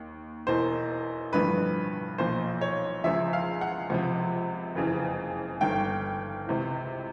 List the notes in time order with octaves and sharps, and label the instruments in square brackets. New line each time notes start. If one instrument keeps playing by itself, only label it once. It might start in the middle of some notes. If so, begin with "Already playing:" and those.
Already playing: [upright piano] D#2 D#3
E1 E2 B2 C5
A1 G2 D3 F3 B4
B1 A#2 F3 C5
C#5
C#2 C#3 F3 E5
F5
F#5
C#2 C3 F3
F#1 F2 C#3 E3
G1 G2 D#3 G5
C#2 C3 E3